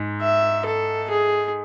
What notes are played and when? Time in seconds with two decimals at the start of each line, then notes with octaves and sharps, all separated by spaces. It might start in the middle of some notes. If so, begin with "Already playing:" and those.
Already playing: G#2
0.22 E5
0.66 A4
1.10 G#4